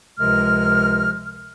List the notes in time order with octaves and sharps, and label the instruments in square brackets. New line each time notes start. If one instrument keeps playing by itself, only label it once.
[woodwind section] C#2 C3 F3 G#3 A#4 F6